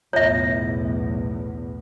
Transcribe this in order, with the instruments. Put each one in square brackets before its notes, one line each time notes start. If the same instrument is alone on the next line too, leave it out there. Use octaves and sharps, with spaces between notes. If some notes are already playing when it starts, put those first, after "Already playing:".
[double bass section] B1 E2 A2 [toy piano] C#5 E5